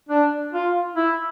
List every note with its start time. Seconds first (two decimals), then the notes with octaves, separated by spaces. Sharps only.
0.09 D4
0.53 F4
0.96 E4